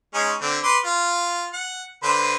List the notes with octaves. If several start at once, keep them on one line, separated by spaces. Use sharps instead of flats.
G#3 C#4 D#4
D3 C4
B4 C6 D6
F4
F#5
D3 B4 C5